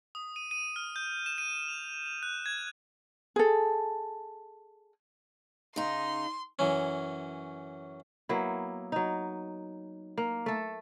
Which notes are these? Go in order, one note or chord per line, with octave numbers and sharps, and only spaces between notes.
D#6
D#7
D#7
F6
G6
E7
D#7
F7
F7
F#6
G#6
G#4 A4
C#3 D#4 C6
F#2 E3 C#4
F#3 A#3 B3 E4
F#3 D#4
A#3
A3 A4